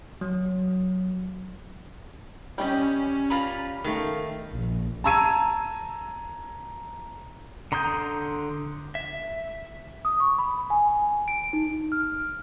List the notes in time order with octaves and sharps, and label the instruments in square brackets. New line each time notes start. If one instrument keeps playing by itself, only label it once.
[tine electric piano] F#3
[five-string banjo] G3 G4 D#5 [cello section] C#4
[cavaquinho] F4 A#5 B5
[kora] D#3 A3 [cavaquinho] F5
[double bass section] A#1
[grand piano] A5 A#5 E6 G#6 D#7
[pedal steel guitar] D3 A#5 C6 D#6 G6
E5
[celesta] D#6
C#6
B5
G#5
D7
D#4
F6